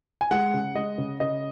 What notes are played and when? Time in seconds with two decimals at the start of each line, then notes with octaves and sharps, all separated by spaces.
0.21 G#5
0.31 G#3 F#5
0.54 C#3
0.75 G#3 D#5
0.98 C#3
1.20 C#3 D#5